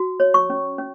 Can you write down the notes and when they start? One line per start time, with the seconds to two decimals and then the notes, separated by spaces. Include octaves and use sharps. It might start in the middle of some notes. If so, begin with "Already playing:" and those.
Already playing: F#4
0.20 C#5
0.34 C#6
0.50 C#4
0.78 C#4